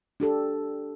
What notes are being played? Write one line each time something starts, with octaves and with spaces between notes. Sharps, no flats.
D4 G4 A4